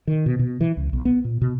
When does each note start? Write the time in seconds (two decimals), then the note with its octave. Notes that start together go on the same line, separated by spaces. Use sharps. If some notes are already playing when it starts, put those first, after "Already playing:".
0.07 D#3
0.26 B2
0.39 B2
0.61 E3
0.77 C#2
0.93 B1
1.05 B3
1.25 A#2
1.42 B2